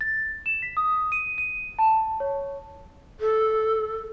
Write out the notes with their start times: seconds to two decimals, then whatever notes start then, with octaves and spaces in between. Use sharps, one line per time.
0.01 A6
0.46 E7
0.62 B6
0.77 D#6
1.12 D#7
1.38 D#7
1.79 A5
2.20 C#5
3.20 A4